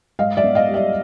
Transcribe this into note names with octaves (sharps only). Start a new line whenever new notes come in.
G#2 D#5 F5
D5 E5
B3
D#5 F5
G3
D5 E5